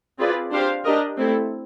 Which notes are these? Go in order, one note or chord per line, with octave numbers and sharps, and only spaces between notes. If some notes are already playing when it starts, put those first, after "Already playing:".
C4 F4 G#4 B4 D5
D4 G4 C5 F5
D4 G4 A#4 D#5
A3 C4 E4 A4